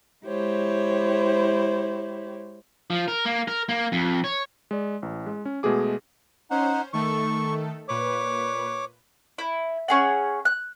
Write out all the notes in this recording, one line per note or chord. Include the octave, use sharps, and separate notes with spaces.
G#3 E4 G4 C5 C#5
F3
A#4
A#3
A#4
A#3
F2
C#5
G#3 D5
A1
G#3
C#4
B2 G#3 A3 G#4 D6
C#4 D#4 C5 F#5
D#3 A3 A4 C#6
A#2 B4 C#5 D6
E4
C#4 G#4 F#5
F#6